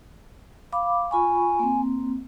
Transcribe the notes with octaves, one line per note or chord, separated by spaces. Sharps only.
F5 B5 D6
F4 G#5 B5 C#6
A#3 C4